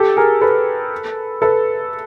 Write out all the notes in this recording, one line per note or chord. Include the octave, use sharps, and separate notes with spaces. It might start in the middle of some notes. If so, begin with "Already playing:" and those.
Already playing: G4 A4
G#4 A#4
A4 B4
A4 B4